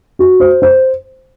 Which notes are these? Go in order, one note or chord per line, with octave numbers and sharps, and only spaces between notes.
F#4
C5
C5